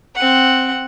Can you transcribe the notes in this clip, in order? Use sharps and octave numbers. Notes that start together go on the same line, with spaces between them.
C4 F#5